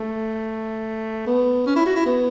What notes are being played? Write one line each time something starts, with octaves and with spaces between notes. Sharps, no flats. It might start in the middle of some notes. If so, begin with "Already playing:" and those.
Already playing: A3
B3
C#4
E4
F#4
E4
B3